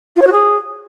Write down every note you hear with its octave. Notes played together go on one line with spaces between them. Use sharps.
F4
C#5
F#4
G#4